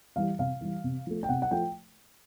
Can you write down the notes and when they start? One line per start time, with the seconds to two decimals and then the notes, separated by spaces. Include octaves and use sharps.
0.16 E3 G3 F5
0.39 C3 F5
0.61 E3 G3
0.84 C3
1.07 F3 A3
1.23 G5
1.29 C3 F#5
1.42 F#5
1.51 F3 A3 G5